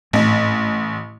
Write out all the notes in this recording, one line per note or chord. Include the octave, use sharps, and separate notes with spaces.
A1 G#2 A3 C4